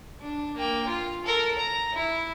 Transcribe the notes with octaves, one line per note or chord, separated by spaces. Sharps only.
D4
A#3 G5
F4
A4 A#4
A#5
E4